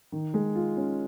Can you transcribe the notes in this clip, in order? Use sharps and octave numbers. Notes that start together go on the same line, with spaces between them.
D#3
G#3
F4
C#4